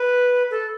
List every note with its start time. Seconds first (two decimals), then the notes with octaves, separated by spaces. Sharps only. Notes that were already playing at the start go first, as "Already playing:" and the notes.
Already playing: B4
0.50 A4